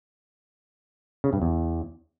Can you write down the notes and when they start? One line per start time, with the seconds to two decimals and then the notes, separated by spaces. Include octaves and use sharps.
1.24 C#3
1.33 G2
1.42 E2